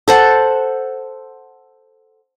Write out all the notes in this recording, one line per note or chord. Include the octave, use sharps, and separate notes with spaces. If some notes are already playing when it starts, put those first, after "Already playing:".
A4 C5 F#5